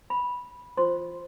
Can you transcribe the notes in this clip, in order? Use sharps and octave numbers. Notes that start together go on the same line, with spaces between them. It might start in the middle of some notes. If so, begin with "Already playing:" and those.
B5
F4 C5 C6